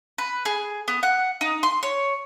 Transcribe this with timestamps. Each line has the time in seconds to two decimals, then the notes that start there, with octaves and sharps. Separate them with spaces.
0.18 B4
0.45 G#4
0.88 B3
1.03 F#5
1.41 D#4
1.63 C6
1.83 C#5